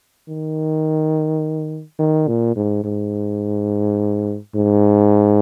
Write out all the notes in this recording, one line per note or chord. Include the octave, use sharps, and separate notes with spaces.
D#3
D#3
A#2
G#2
G#2
G#2